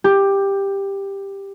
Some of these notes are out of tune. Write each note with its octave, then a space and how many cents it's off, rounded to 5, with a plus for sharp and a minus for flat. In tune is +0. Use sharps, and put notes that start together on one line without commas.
G4 +10